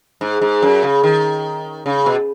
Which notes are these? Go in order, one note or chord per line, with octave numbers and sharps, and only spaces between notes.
G#2
G#2
F#2
C#3
D#3
C#3
B2